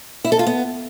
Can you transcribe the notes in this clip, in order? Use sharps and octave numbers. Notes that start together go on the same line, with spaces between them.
E4
A4
F4
B3